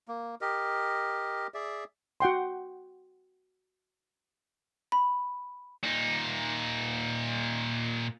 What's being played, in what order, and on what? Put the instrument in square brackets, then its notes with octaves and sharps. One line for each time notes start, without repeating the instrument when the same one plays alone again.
[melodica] A#3
G4 A#4 D#5
G#4 D5 E5
[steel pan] F#4 F#5 G5 C6
[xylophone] B5
[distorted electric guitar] A#2 D#4